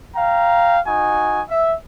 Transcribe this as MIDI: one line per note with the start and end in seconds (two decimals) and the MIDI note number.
0.15 0.78 77
0.15 0.78 79
0.15 0.78 82
0.86 1.42 63
0.86 1.42 66
0.86 1.42 80
1.50 1.73 76